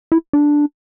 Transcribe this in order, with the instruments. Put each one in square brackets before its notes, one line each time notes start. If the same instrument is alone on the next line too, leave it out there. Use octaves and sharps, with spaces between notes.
[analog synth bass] E4
D4